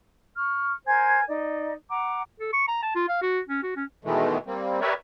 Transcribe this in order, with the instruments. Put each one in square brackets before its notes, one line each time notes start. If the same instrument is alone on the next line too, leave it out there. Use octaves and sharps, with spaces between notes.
[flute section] C#6 F6
A#4 C5 G#5 G#6
D#4 D5
F#5 A#5 D6
[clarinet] A4
C#6
A#5
A5
F4
F5
F#4
C#4
F#4
C#4
[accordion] B2 D#3 E3 G#3 A3
G3 A#3 C4
G4 A#4 B4 C#5 D5 E5